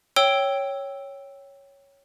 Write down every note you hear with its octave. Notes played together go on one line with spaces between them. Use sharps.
C#5 G5 E6 D7 G7